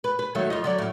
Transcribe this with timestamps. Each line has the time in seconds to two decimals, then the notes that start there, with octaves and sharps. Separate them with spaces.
0.04 B4
0.19 B4
0.35 D#3 F#3 A3
0.50 F2 F4 D#5
0.64 D3 F#3 D5
0.78 F#2 A2